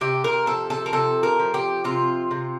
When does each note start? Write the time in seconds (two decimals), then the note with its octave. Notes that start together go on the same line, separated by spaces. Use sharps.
0.01 C3 G4
0.24 A#4
0.46 F3 A4
0.70 A4
0.86 A#4
0.93 C3 A4
1.23 A#4
1.39 F3
1.54 G4
1.84 C3 F4
2.31 C3